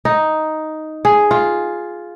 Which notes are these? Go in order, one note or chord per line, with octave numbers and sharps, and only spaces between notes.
D#4
G#4
F4